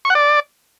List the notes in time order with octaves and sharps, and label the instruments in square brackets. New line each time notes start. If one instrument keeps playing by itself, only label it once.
[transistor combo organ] C#6
F#5
D5